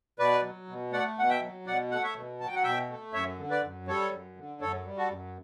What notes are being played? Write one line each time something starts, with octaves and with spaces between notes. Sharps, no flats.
B2 B4 D5
F#3
B2
A3 D5 F#5
B2 F#5
E5 G5
F#3
B2 D5 F#5
A3 F#5
C#5 E5
B2
F#3 A5
G5
F#5
B2 E5 G5
A3
F#2 C#5 E5
D3
B4 D5
F#2
G3 A4 C#5
F#2
D3
F#2 A4 C#5
G3
F#4 A4
F#2